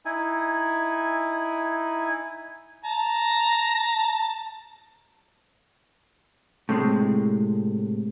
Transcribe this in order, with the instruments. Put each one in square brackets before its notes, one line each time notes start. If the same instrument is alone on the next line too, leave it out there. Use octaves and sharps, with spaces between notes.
[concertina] D#4 E4 G#5
[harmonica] A5 A#5
[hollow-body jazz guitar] A2 C3 G#3